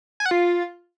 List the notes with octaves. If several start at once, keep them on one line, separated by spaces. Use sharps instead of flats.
G#5
F#5
F4